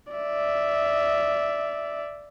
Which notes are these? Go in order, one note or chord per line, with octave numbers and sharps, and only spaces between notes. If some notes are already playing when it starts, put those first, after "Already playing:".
D5 E5